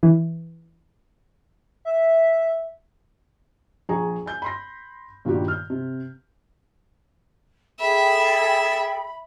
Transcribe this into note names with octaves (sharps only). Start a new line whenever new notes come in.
E3
E5
A#1 G#4 A#5 C#6
G#5 G6
B5 C6 A#6
G2 A#2 D#3 G3 F#4 G4
F6 G6
C3
G#4 A4 E5 G5 B5